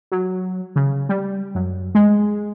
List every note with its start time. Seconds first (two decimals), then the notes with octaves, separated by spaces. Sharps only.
0.12 F#3
0.76 C#3
1.09 G3
1.55 F#2
1.95 G#3